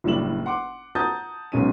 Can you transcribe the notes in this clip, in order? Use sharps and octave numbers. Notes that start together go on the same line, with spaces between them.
F#1 A2 G3 D4 E7 F#7
F#5 C6 D6
F#5 A5 A#5 D#6 G6 A6
B1 B2 G#3 C#4 D#4 D#7